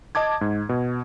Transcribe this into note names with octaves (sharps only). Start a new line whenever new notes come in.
D#5 A5 D6 G#6
G#2
B2